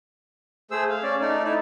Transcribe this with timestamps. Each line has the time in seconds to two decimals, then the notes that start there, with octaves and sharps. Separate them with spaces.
0.71 A3 G#4 C5 E6
0.90 F5
1.03 C#4 D5
1.21 A3 D#4 D5
1.44 D#4 E4